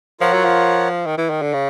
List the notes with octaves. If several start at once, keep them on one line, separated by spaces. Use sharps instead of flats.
F3 F4 A#4 C#5 F#5
F#3
F3
D#3
E3
D#3
D3
C#3